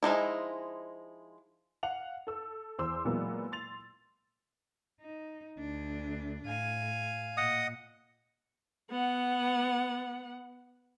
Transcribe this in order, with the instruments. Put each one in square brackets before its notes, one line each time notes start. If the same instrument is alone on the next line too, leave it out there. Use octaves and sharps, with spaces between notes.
[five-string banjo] F3 G#3 D#4 E4
[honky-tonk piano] F5 F#5 F7
A4 E6
E2 C5 C6 D6 E6
A#2 E3 F#3 G#3 A#3 B3
C6 A6 F7
[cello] D#4
D2 D4
[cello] A2 [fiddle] F5 G#5
[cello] A#2 [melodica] D#5 F#5 D#6
[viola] B3 F#5